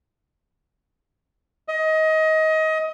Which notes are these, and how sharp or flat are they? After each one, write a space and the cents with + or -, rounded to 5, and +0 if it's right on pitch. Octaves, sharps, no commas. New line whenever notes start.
D#5 +25